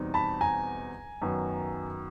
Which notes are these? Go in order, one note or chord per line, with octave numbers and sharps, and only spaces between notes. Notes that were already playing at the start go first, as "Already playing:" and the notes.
Already playing: E2 B2 G3 C4 D#4
A5 B5
G#5 A#5
F#2 D#3 F#3 B3